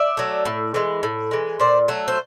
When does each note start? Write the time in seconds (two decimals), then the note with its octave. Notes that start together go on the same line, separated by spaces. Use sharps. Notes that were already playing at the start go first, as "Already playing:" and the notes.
Already playing: D5 E5
0.17 F#3 A3
0.45 A2
0.74 E3 G#3
1.03 A2
1.31 E3 G#3
1.60 A#2 C5 D5
1.88 F#3 A3
2.08 C5